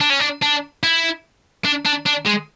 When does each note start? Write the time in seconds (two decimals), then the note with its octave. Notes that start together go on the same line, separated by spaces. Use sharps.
0.01 D4
0.10 C#4
0.20 D4
0.42 D4
0.83 E4
1.65 D4
1.85 D4
2.06 D4
2.26 G#3